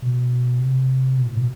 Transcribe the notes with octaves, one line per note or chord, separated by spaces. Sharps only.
B2
C3
B2
A2
B2